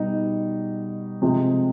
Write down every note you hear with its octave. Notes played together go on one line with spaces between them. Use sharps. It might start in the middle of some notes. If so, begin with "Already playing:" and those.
Already playing: B2 G3 D#4
C3 F3 G#3